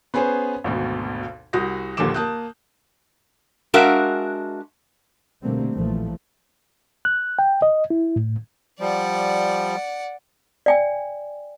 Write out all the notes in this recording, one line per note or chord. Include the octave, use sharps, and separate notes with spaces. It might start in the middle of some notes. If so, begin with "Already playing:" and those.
B3 C#4 G#4 B4 C5
G#1 D2 B2
C2 F#4 D#6 G6 A#6
A#1 D#2 D3 F3 D6 E7
A#3 A5 D#6 F#6 G6
G#3 D4 F#4 A#4 E5 F5
B2 D3 G3 A3 A#3 C4
A#1 A#2 E3 F3 A3
F#6
G5
D#5
E4
A2
F3 G3 D5 F#5
D5 G5 G#5